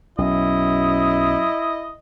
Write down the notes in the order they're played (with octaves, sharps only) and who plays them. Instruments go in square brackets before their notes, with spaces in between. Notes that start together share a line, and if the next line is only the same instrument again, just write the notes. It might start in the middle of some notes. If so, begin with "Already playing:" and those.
[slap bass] B1 [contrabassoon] F#2 [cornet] E4 [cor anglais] D#5